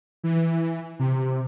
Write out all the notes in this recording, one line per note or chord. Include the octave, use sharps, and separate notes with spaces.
E3
C3